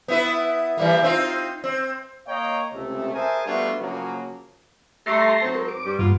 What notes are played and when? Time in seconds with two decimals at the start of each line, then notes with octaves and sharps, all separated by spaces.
0.08 B3 E4 B4
0.77 E3 G3 A#3
1.03 C4 D#4 F4
1.64 C4
2.27 A#3 C#5 D#5 F5 G5 A#5
2.73 C#2 C3 A3
3.13 G#4 A#4 C5 E5 G#5 A5
3.46 G3 A3 B3 D4 F4 F#4
3.79 C#3 F3 F#3 A#3
5.06 G3 A3 A5 A#5 C6
5.42 G#2 F#3 C4
5.55 A#4
5.68 D6
5.85 G2 G3
5.99 G2 A#3 B3 F4